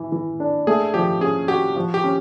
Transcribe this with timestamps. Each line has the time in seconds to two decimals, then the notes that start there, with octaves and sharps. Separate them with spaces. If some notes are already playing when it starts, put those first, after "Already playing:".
Already playing: E3
0.12 E3
0.40 D4
0.67 A3 G#4
0.94 F3 G4
1.21 C#4 G#4
1.48 F#4 G4
1.76 F3
1.94 G4
2.04 C#4